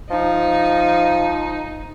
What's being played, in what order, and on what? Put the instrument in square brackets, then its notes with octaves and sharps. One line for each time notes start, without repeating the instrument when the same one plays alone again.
[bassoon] F3 [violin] D#4